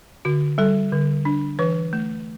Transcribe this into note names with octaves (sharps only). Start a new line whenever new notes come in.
D3 F#4
G3 A4
D3
D4
E3 B4
A3